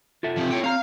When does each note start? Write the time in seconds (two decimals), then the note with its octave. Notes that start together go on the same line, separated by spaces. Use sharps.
0.23 F4 A4 E5
0.36 C3 F3
0.50 C#5 G5
0.64 C4 F5 A#5